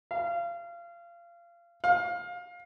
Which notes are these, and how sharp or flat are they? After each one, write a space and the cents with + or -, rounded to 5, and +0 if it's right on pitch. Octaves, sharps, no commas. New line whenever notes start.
F5 -25
F5 +25